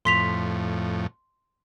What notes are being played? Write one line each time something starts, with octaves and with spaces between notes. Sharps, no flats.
F2 A2 C6 B6 F7